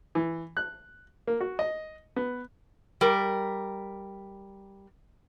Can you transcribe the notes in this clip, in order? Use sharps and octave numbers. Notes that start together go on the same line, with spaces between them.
E3
F#6
A#3
F#4
D#5
B3
G3 A#4